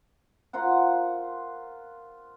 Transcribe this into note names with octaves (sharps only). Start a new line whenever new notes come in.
F4 A#4 C5 F#5